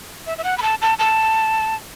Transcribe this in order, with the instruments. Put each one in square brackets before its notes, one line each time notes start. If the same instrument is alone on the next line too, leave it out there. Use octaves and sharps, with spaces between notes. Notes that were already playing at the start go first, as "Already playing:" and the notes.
[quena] E5
E5
F#5
B5
A5
A5
A5